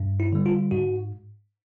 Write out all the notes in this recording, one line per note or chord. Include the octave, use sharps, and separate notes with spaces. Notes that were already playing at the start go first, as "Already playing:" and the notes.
Already playing: G2
E4
D3 G3
F4
G#2 F#4